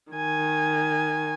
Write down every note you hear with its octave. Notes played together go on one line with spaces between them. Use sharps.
D#3 G#5